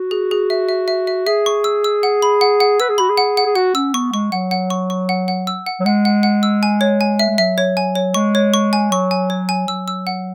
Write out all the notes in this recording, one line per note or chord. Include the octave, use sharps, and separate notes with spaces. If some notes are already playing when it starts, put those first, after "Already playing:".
Already playing: F#4
G#4
G#4
E5
E5
E5
E5
G#4 E5
C#6
E6
E6
F#5
B5
F#5
F#5
B4 E6
G#4
F#4 B5
G#4
F#5
F#5
G#4
F#4 F#5
C#4 E6
B3 C#6
G#3 C#6
F#3 F#5
F#5
C#6
C#6
F#5
F#5
E6
F#5
F#3
G#3 F#5
F#5
F#5
E6
G#5
C#5
G#5
E5
G#3
F#3 E5
C#5
G#5
C#5
G#3 C#6
C#5
C#6
G#5
F#3 C#6
G#5
C#5
G#5
F#3 E6
E6
F#5